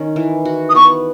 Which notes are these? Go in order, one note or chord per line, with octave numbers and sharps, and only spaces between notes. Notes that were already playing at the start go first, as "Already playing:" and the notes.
Already playing: D#3 C#4
E3
F#4
D#6
B3 C#6